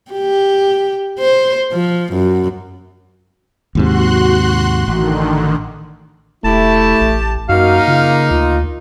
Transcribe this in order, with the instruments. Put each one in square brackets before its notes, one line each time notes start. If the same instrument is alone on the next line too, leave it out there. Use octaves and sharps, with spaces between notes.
[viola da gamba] G4
C5
F3
F#2
[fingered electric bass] D#2 G#2 C3 [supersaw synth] F#4 C6 F#6
[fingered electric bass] A1 [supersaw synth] D3 D#3
[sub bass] E1 [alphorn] A3 [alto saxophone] E4 [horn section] G4 A5
[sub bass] A1
[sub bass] F#2 [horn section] A#3 D#4 [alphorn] F#4 [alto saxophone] F5
[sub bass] C#3 [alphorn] F4
[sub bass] D2 [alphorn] F4